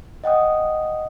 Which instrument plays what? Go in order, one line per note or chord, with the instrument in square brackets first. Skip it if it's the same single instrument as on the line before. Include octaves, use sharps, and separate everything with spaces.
[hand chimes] D#5 F#5 G5 D#6